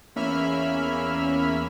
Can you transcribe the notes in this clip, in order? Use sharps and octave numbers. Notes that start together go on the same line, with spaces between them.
E2 A#3 C#4 E5 B5 F6